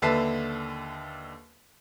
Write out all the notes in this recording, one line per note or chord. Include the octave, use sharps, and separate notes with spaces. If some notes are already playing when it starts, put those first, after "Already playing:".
D#2 D3 B4 E5 A5 C7